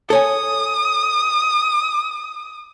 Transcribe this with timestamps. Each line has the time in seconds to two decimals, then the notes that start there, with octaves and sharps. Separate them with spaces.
0.10 A4 C#5 G#5 D#6